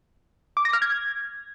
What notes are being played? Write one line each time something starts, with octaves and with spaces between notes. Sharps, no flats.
D6
A#6
F6
G#6